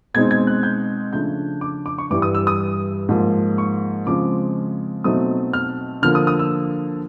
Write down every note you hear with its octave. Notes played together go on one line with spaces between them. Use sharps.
B2 G#3 C4 D#4 G#6
G#6
F#6
G6
C#3 F3 A3 D4 G6
D6
D6
C#6
G2 E3 G3 D6
D#6
E6
D#6
G#2 F3 A#3
C#6
C#3 F3 G#3 C4 D6
B2 F#3 A3 C4 D#4 D#6
F6
D3 F3 A#3 F6
D#6
D#6
E6